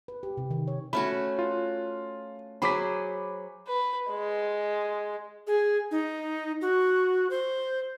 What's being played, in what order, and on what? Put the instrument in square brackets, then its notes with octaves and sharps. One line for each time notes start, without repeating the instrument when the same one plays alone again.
[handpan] B4
G4
C3
D#3
C#5
[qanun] A3 C#4 F#4 [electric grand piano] B5
[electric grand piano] F4
[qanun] F#3 G#4 C5 [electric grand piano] B5 D6 B6
[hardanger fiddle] B4
G#3
[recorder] G#4
D#4
F#4
C5